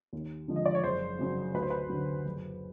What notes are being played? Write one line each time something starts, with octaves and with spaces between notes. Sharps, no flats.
D#2
D3 F3 G#3
D#5
D5
C#5
F#1 C5
F#2 C#3 F#3
D2 B4
C5
B4
D3 F#3
F#1